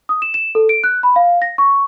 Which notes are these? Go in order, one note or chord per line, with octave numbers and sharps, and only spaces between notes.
D#6
E7
E7
A4
D7
F#6
B5
F5
A#6
C#6